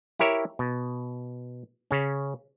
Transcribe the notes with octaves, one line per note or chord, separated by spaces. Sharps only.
E4 G4 A#4 C#5 E5
B2
C#3 C#4